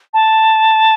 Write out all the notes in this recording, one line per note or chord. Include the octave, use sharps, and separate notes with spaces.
A5